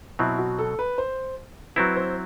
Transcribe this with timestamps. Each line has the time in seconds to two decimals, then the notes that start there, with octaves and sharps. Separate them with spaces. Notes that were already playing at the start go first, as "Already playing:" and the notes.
0.19 B2 F#3 C4 E4
0.39 F#4
0.59 A4
0.79 B4
0.98 C5
1.76 F#3 C4 E4 B4
1.96 C5